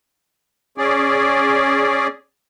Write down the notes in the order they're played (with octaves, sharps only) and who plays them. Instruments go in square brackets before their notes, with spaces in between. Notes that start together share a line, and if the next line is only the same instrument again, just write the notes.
[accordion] C#4 G#4 D5